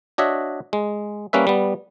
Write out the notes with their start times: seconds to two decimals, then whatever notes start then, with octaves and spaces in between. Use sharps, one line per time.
0.18 D4 F#4 C#5 D#5 E5
0.73 G#3
1.33 G3 A#3 C#4 B4 E5
1.47 G3 B3